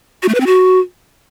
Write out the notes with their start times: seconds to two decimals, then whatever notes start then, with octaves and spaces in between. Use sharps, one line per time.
0.23 F#4
0.29 A3
0.35 B4
0.40 C4
0.46 F#4